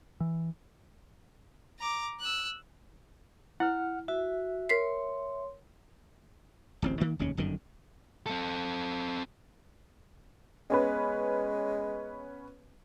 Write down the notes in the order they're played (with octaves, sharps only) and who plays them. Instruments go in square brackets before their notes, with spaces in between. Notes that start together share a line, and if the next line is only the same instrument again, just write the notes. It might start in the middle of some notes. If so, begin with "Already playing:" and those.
[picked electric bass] E3
[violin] A#5 D6
E6 F#6
[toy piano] E4 [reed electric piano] F#5 F6
[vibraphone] F#4 [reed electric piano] E5
[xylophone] A#4 B6 C7 [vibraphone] C#5 C6
[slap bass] D1 A1 C4
D#3 A#3
F1 D#2 C#3 C#4
G1 F#2 D3 D#3
[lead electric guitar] C4 A4
[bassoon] G#3 [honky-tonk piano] B3 C#4 B4